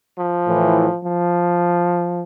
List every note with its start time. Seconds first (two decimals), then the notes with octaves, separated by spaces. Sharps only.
0.17 F3
0.46 A2 E3
1.03 F3